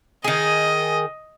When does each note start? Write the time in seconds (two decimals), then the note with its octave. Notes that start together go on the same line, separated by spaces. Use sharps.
0.24 D#3 G#4 D#5